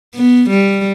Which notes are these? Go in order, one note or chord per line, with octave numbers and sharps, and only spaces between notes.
B3
G3